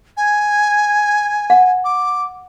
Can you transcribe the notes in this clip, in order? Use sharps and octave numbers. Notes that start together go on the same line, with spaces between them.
G#5
F#5
D6